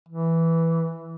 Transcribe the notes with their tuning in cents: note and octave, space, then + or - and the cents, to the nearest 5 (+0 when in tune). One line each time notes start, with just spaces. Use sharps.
E3 +0